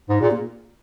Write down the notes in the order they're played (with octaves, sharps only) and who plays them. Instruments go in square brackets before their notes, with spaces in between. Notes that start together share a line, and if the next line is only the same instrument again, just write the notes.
[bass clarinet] G#2
[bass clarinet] A#2 [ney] G#4
[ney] A#3